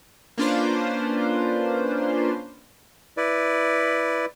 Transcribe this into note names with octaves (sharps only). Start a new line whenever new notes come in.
A#3 C#4 D4 F4 B4 C5
E4 B4 D5